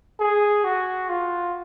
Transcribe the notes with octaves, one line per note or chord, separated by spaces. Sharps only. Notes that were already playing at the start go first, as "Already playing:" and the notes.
G#4
F#4
F4